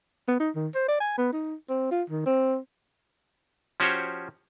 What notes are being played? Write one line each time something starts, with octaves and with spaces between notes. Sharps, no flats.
B3
D#4
D#3
C5
D5
G#5
B3
D#4
C4
F4
D#3
C4
F3 C#4 F#4 G4 C5 C#5